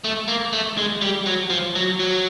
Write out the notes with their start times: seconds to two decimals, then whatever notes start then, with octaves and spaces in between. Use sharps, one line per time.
0.04 A3
0.28 A#3
0.53 A3
0.78 G#3
1.02 G3
1.26 F#3
1.50 F3
1.76 F#3
2.00 F#3